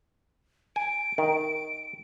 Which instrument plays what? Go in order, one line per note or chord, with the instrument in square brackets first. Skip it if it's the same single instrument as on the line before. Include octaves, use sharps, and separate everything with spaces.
[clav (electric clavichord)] G#5 [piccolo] D7
[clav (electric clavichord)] D#3